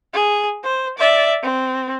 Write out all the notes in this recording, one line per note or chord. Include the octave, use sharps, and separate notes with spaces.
G#4
C5
D5 E5
C4